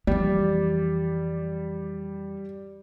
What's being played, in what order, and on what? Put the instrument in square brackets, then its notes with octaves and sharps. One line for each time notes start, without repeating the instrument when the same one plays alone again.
[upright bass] F2 E3 [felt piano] G3 [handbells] G4 D5